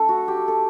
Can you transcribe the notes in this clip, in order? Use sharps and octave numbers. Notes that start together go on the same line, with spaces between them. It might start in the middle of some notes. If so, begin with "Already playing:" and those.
Already playing: A3 D4 A4
F#4
G4
A4